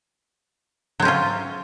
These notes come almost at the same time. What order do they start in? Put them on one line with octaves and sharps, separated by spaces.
F#3 C4 C#4 F4